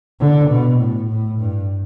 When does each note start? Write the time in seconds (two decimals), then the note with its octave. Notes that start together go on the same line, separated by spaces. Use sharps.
0.20 D3
0.50 B2
0.80 A2
1.09 A2
1.39 G2